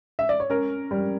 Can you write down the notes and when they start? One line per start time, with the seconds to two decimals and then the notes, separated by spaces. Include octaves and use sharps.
0.19 E5
0.29 D5
0.40 C#5
0.50 C#4 A#4
0.91 G3